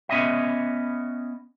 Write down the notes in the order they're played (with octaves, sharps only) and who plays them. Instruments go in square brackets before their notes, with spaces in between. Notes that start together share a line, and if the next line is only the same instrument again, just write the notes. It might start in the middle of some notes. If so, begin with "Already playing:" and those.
[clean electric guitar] B3 C#4 D#5 E5